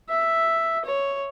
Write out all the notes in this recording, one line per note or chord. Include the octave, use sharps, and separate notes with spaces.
E5
C#5